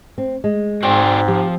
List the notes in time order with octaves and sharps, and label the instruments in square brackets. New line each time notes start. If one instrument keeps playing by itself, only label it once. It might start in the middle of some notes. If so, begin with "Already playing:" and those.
[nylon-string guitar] C4
G#3
[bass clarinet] G#2 [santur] C4 [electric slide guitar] F#4 G#4 D5
[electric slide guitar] F3 [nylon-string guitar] G4